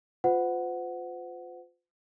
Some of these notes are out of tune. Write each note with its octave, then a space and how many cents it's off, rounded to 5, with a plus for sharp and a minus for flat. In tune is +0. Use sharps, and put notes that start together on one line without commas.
F4 +20 C5 -40 F#5 +0